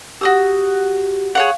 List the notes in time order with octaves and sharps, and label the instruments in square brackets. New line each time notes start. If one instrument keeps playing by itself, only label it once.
[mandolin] F#4 D#6 E6 [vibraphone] G4
[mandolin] G#4 C#5 F#5 [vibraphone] F5